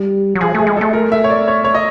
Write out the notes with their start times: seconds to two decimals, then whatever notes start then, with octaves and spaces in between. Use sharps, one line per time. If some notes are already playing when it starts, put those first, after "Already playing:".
Already playing: G3
0.35 F#3
0.41 F3 G#4
0.55 A3 G#4
0.67 G#3
0.77 A3 A4
0.93 A#4
1.12 E5
1.24 C#5
1.30 D5
1.48 C#5
1.64 C#5
1.74 D#5